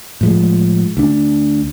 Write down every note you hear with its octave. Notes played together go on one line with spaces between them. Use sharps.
A2 F3 G#3
D2 D4